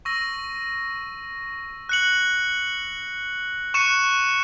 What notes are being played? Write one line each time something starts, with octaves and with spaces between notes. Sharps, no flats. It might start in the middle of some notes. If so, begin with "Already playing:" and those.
C#6 E6 A#6 D#7
F#6 C#7 F#7
C#6 F#6 C#7 E7